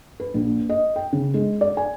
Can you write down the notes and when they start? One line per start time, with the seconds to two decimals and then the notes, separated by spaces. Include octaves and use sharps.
0.20 B4
0.34 A#1
0.69 D#5
0.96 G5
1.13 C#3
1.34 G#3
1.61 D5
1.77 G#5